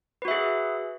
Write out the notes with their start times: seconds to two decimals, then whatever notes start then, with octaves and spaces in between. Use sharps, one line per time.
0.22 B4
0.25 F#4
0.28 E5
0.31 G#4